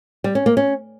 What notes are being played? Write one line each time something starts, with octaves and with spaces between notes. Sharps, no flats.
G3
C#4
A#3
C#4